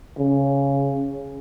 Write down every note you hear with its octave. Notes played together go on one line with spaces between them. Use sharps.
C#3